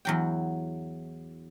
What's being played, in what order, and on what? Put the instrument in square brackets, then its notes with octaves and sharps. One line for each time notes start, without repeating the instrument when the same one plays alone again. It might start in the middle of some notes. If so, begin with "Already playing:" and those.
[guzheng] E2 F#3 G5